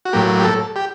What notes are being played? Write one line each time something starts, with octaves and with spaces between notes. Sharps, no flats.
F#4
A2 F#3 A#3 G4
G4
A4
G4